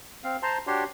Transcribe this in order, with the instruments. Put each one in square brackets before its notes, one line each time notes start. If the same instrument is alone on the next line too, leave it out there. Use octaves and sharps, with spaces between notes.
[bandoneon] C4 F5
C5 A5 A#5 C6
D4 F#4 G4 C#5 C6